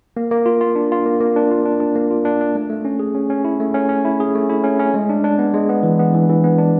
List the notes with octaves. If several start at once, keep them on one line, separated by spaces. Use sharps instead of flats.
A#3
A#3
F4
F4
D4
F4
A#3
A#3
D4
F4
D4
D4
A#3
F4
D4
D4
A3
A3
C#4
G#4
C#4
C#4
E4
A3
C#4
C#4
E4
G#4
A3
E4
C#4
C#4
G#3
D4
D4
B3
G#3
B3
E3
B3
E3
E3
B3
D4